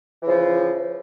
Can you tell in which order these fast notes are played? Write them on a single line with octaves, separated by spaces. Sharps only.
E3 C#3 F3